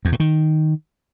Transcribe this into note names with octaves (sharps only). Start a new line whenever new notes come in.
E2
A2
D#3